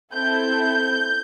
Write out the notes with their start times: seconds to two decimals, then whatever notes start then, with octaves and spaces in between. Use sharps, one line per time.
0.13 C4 E4 A4 G6